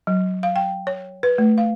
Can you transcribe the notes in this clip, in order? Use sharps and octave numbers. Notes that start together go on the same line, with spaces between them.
F#3
F5
G5
C#5
B4
A3
F5